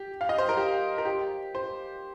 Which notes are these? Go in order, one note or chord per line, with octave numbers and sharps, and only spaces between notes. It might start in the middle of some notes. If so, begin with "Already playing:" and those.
Already playing: G4
F5
D#5
C5
A#4
G4
A#4
G4
C5